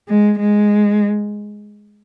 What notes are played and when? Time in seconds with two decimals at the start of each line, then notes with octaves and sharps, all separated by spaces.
0.09 G#3
0.39 G#3